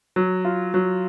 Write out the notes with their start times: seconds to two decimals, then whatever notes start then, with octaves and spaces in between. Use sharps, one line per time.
0.16 F#3
0.45 F4
0.74 F#3